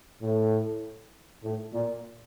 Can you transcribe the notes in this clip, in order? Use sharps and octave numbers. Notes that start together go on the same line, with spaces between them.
A2
A2
A#2